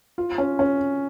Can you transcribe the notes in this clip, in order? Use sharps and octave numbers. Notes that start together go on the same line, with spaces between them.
F4
C#4
C#4